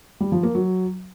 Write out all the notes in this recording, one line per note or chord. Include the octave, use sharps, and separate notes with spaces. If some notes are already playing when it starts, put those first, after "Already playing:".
G3
F3
A#3
F#3